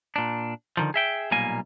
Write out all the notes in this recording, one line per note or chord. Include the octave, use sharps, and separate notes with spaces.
A#2 D4
D3 D#3 F3
G#4 E5 G5
B1 A#2 G3 A#3 G#5